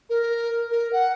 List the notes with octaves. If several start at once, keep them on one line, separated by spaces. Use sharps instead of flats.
A#4
A#4
F#5